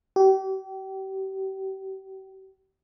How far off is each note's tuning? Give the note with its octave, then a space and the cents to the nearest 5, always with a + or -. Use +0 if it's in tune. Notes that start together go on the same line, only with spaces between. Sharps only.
G4 -35